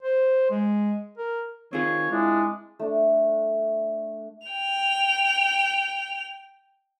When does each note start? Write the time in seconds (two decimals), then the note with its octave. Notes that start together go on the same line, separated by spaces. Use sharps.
0.03 C5
0.51 G#3
1.17 A#4
1.73 D#3 C4 F4 G#4 C#5
2.11 G#3 D4 E4
2.79 A3 D4
4.47 G5 F7